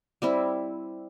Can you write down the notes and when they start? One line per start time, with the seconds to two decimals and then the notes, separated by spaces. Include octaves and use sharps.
0.22 G3 C4 E4